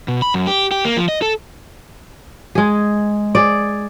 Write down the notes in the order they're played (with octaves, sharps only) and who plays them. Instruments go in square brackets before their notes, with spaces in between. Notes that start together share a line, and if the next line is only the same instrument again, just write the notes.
[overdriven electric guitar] B2
B5
F#2
G4
G4
A#3
F3
D#5
A4
[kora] G#3 G#4
G#4 D5